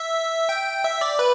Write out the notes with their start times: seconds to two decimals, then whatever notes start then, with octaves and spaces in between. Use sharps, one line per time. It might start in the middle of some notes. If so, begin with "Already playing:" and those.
Already playing: E5
0.49 G5
0.84 E5
1.01 D5
1.19 B4